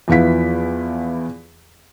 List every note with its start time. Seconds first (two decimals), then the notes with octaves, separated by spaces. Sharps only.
0.08 E2 F3 B3 E4 F5 B6